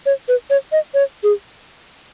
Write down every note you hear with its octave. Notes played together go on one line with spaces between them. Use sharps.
C#5
B4
C#5
D#5
C#5
G#4